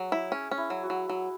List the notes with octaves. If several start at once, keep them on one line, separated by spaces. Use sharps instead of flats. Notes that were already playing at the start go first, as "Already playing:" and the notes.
Already playing: F#3 G#4
E4
C#4 G#4
C#4
E4
F#3
F#4
F#3
F#3